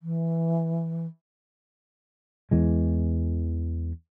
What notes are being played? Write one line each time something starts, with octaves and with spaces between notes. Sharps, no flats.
E3
E2 E3 G#3